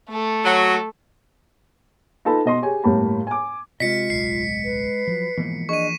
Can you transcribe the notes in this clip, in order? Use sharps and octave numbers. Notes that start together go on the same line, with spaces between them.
A3 A4
F#3
D#4 F4 A4 B4 A5 B5
B2 D#5 C6
G4 G#4 C#5 G#5
G1 A2 A#3 G4 A5 B5
G#5 D6
C3 G#3 F4 D#5 B6 C#7
D1 B1 C7
B4
F3 F#3
G#2 B2 E3 F3 A#3
D4 G#4 D#5 C#6 D#7